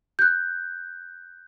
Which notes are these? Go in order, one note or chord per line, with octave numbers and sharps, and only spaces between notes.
F#6 G6